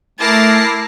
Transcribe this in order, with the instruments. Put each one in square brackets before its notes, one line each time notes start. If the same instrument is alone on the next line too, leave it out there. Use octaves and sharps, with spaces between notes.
[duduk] A3 [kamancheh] E4 A#4 [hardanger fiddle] A5 [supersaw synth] D6 A#6 C7